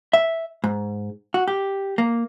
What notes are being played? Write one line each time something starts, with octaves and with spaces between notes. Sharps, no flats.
E5
G#2
F#4
G4
A#3